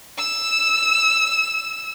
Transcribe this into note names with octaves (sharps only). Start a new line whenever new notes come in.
E6 E7